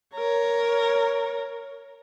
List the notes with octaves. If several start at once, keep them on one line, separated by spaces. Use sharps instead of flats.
A#4 C#5